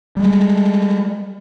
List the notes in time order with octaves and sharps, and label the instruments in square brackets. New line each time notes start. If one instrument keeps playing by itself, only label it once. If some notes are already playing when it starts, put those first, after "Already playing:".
[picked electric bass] G3 G#3